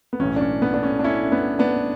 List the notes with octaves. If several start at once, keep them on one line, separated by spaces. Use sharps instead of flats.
B3
B1 A2 E3 C#4
D4
C#4
B3
D4
C#4
D4
C#4 E4
B3 D4
B3 D4